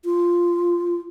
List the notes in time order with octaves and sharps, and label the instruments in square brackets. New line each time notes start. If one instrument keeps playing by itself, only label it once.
[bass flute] F4